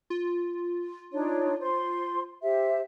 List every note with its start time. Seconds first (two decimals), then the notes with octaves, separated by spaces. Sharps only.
0.10 F4
1.12 D4 D#4 C#5
1.61 C5 C6
2.42 G4 C5 E5